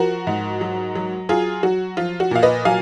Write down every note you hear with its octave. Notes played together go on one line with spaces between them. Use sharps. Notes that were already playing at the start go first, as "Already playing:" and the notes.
Already playing: F3 F#4 A#4
G#2
F#3
F#3
F#3 F4 G#4
F#3 F#4
F3 F4
F#4
A#2 F5
B4 D#5
F#3 F5 G#5